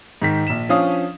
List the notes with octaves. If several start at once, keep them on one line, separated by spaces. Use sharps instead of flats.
G#2 D#3 B6
A#1 E7
F3 C#4 D4 F5 D#6